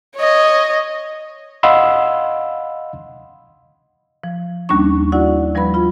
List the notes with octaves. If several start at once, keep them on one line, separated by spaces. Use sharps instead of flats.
C#5 D#5
D#5 F5 F#5 B5 C6 E6
F3
D#2 G3 A#3 C#4 D4 C#6
E4 F#4 D5 F#5
F3 G3 B4 B5
F4 B5